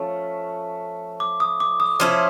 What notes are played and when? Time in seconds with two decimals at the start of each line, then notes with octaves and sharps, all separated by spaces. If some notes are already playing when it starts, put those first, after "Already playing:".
Already playing: F3 A3 C#4
1.20 D6
1.40 D#6
1.60 D6
1.80 D#6
2.00 F3 A3 C#4 E4